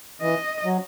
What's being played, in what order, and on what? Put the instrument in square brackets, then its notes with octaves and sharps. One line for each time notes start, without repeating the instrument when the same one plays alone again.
[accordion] E3 [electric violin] D#5
[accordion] F#3